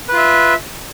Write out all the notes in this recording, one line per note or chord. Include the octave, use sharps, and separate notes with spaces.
F4 B4 E5